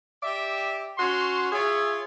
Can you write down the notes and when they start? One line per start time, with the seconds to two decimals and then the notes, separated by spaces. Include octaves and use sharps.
0.23 G4 D5 E5
0.98 C#4 F#4 C6
1.52 F4 G#4 C#5 E5